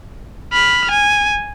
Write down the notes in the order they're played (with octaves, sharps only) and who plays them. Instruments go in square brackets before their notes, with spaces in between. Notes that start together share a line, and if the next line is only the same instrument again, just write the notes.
[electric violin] B5 F6
G#5